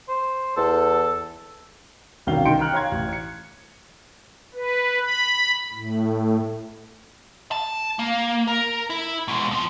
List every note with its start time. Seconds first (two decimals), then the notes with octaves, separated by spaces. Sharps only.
0.08 C5
0.57 E2 A4
2.27 C2 B2 D#3 C#4 F5 G7
2.45 D#3 D#4 G5 C6 C#7 D7
2.59 G5 A#5 F6 F#6
2.73 C#5 F5 A#5 C6 G#6
2.92 A1
3.09 G#6 C#7
4.54 B4
5.02 B5
5.73 A2
7.51 A5
7.99 A#3
8.47 A#4
8.90 E4
9.28 B2 G#3
9.51 F2 F3